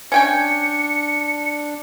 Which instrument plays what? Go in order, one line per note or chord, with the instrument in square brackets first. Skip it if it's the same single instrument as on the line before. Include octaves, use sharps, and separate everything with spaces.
[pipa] C#4 G5 G#5 [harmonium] D4 [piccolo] C#7